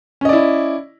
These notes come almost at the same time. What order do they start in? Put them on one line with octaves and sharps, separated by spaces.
C#4 D#5 D5 E4